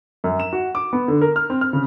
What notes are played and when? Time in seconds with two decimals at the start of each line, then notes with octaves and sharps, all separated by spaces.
0.24 F#2
0.40 E7
0.53 F#4
0.75 D6
0.93 B3
1.08 D3
1.21 A#4
1.36 F6
1.50 C4
1.61 F6
1.73 C#3